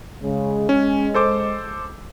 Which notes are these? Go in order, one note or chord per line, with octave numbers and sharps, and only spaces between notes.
C#3 G#3
G#3 C#4
A4 C5 D6